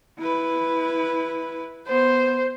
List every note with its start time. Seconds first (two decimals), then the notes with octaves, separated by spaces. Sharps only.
0.19 E4 B4
1.88 B3 C5